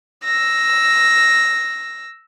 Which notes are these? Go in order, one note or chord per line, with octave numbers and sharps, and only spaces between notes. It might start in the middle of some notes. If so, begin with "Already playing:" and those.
E6 A#6